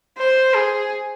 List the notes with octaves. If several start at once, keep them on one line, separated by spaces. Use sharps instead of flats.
C5
G#4